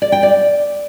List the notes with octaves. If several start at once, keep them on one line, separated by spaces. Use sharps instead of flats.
D5
G5
D5